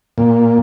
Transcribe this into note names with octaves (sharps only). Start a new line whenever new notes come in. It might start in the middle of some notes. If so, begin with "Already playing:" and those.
A#2